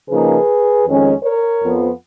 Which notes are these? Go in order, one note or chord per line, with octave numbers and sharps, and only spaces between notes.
C#3 F3 A#3 D#4 G#4 B4
F2 D#3 G#3 C#4
A#4 C#5
F2 F3 B3